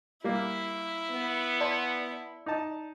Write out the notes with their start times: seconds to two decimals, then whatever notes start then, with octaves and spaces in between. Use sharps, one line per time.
0.24 G3 A#3 E4
1.11 B3
1.61 D5 A5
2.46 D#4 A5